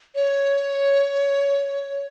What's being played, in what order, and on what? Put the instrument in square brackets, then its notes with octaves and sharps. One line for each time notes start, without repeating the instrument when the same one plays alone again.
[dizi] C#5